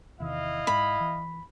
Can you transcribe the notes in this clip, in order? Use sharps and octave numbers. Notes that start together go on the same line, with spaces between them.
E2 C3 D#3 E4 D#5 F5
G#2 G#3 B5
E3